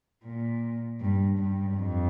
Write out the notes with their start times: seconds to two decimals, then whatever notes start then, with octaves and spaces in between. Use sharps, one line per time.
0.23 A#2
1.00 G2
1.38 G2
1.77 F2